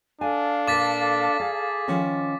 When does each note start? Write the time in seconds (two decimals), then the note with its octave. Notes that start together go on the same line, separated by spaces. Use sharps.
0.21 D4 A4 F5 G#5
0.68 A#2 A#4 D6 A6 B6
1.40 G#4 D5
1.88 D#3 F3 C#4